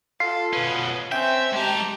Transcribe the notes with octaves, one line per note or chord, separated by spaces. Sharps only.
F4 A4 C7
B2 C#4 B4
C4 C#4 E5 G5 G6
G#3 G4 A5 A#5